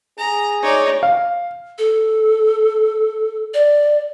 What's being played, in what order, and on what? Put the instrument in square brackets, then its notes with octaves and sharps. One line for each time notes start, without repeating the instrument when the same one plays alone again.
[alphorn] G#4 [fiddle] A#5
[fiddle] D#4 [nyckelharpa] C#5 D5
[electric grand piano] F5
[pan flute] A4
D5